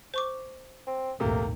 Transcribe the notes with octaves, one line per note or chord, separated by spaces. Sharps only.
C5 C#6 D6
C4
A#1 D#2 G#2 C3 A3 A#3